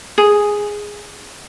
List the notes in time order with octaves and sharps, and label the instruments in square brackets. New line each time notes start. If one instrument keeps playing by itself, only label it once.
[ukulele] G#4